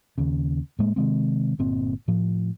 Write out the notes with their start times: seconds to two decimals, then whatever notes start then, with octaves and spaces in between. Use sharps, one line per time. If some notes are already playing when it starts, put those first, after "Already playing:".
0.18 D#2 C#3
0.79 A2 G#3 A#3
0.96 C3 D#3 G#3 C4
1.59 G1 A#2 C4
2.08 A2 F3